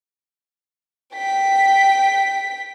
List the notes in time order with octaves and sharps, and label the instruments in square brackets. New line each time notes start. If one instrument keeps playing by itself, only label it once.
[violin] G5 B6